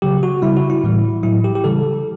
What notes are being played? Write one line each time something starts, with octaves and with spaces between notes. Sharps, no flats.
C#3 F#3 G4
F#4
C#3 G3 E4
F#4
E4
A2 E3 G3
A2 F#3 E4
G4
G4
C#3 E3 G3 A4